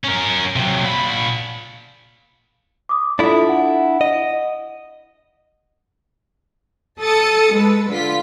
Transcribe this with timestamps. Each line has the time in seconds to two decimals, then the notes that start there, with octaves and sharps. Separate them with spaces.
0.05 C#4 A#4
0.56 C3 F#3
0.83 A#2 B5
2.89 D6 D#6
3.19 D4 E4 F4 A4 E5
3.49 F#5
4.01 D#5
7.01 A4 A5 D#6 A6 C#7
7.53 G#3 B4
7.90 D3 F4 B6